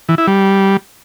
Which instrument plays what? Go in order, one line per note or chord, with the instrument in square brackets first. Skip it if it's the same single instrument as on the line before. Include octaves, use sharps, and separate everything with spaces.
[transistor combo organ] E3
E4
G3